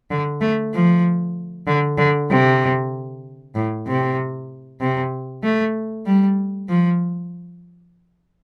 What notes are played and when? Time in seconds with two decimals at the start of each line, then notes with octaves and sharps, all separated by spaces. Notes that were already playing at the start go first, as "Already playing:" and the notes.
0.11 D3
0.41 A3
0.73 F3
1.67 D3
1.98 D3
2.30 C3
3.55 A2
3.87 C3
4.80 C3
5.43 A3
6.06 G3
6.69 F3